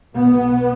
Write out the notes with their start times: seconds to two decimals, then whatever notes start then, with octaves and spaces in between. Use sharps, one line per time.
0.14 B1 B2 B3